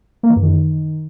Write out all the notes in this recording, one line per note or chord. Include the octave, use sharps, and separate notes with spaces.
A#3
E3
F#2
D#3